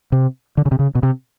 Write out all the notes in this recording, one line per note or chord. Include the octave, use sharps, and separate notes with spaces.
C3
D3
C#3
C3
C#3
B2
C3